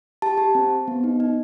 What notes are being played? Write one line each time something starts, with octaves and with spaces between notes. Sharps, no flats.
G4 A5
G4
C4
C4
B3
D#4
D#4